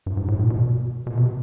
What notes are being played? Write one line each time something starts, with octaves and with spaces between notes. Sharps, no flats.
G2
G#2
A2
A#2
B2
B2
C3